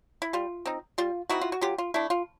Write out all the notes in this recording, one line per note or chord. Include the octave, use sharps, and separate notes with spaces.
E4
G3 F4
C4 D#4
G3 F4
C4 D#4 E4 F#4
F4
F#4
F#3 F4 G4
F4
A3 D4 E4
F4